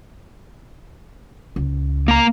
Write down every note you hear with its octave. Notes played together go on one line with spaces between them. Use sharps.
C#2
A#3 A#5